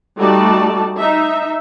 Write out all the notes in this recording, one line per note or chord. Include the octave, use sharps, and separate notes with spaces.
G3 A3 D#4 F#4 D5 A5
D#4 E5